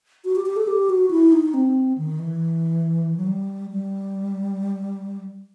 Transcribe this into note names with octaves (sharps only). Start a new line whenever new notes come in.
F#4
G4
G4
A4
G4
F#4
E4
D#4
C4
D#3
E3
F#3
G3
G3